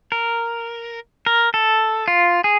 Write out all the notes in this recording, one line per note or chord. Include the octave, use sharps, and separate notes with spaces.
A#4
A#4
A4
F4
G#4